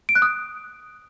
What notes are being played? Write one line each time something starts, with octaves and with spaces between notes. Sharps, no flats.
D7
F#6
D#6